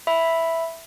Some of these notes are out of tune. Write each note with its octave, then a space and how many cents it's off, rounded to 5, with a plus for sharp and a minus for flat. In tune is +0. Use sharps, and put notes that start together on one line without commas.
E5 +0 B5 +0